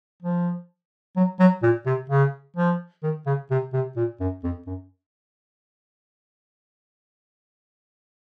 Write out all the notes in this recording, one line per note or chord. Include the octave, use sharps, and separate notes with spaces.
F3
F#3
F#3
A#2
C3
C#3
F3
D#3
C#3
C3
C3
A#2
F#2
F2
F#2